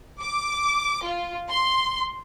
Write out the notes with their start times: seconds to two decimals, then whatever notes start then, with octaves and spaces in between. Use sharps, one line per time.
0.21 D6
1.05 F4
1.50 C6